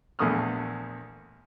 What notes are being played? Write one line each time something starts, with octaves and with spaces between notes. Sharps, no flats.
A#1 E2 A3 D#6 F6